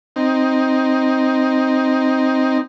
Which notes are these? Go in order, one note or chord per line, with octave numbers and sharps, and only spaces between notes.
C4 D#4